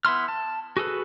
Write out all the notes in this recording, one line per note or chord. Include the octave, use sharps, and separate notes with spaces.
B3 E4 C6 F6
A5
F#4 G#4 A4 B4